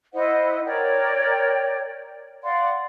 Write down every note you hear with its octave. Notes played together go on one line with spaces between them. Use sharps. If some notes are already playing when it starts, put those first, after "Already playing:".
E4 C5 D#5 F#5
A#4 C#5 D5 G5
D5 F5 F#5 C6